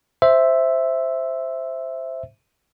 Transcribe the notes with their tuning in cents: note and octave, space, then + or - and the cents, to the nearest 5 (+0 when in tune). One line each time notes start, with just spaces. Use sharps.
C5 +0 E5 +0